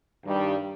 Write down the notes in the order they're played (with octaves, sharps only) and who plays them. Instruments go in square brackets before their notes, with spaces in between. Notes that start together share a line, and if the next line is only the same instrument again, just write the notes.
[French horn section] G2 D#3 G3